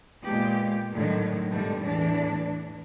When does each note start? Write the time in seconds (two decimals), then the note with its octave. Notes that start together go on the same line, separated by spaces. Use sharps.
0.25 A#2 G#3 B3 G4
0.94 A2 D3 D#3 F#3
1.51 G#2 B2 D3 G3 A3
1.83 E2 A2 E3 D4